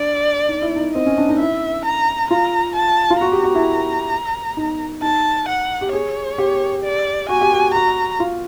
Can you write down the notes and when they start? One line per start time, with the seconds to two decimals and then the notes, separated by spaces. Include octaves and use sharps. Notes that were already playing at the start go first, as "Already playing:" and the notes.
Already playing: D4 D5
0.49 D#4
0.62 E4
0.76 D#4
0.94 C4 D#5
1.06 C#4
1.18 D4
1.29 D#4
1.39 E4 E5
1.85 A#5
2.30 F4 A#5
2.75 A5
3.10 F4
3.21 F#4 A#5
3.32 G4
3.43 F#4
3.55 E4
4.57 D#4
5.02 D#4 A5
5.48 F#5
5.81 G4
5.93 G#4 C#5
6.38 G4
6.84 D5
7.29 F#4 G#5
7.41 G4
7.53 F#4
7.74 F#4 A#5
8.20 F4